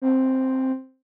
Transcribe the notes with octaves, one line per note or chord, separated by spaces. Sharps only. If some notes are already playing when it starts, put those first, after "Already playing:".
C4